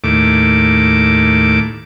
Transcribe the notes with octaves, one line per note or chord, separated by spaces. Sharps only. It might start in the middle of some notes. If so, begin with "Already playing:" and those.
D#2 A2 D6